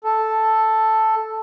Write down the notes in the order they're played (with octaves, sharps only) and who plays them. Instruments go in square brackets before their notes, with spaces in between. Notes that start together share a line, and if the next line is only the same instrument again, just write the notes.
[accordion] A4